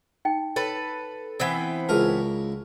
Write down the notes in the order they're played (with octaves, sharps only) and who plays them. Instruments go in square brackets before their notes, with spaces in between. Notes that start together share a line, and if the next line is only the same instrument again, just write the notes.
[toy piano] D#4 G5
[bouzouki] A4 B4 [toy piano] C#5
[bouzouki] E3 B3 C4 [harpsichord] G5
[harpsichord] C#2 A#4 [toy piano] G#4 A5